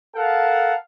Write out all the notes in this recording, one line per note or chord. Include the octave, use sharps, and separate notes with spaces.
A4 A#4 F5 F#5 A5